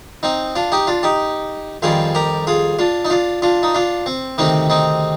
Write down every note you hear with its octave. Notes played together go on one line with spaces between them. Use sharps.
C4 D#4
D4 F4
D#4 G4
D4 F4
D#4 G4
F2 D#3 G3 F4 G#4
G4 A#4
F4 G#4
D4 F4
D#4
D4 F4
D4 F4
D#4
D4 F4
C4
D2 C3 D#3 C4 D#4
C4 D#4